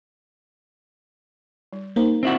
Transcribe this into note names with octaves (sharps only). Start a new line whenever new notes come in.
G3
A#3 D#4 C5
C4 E4 F#4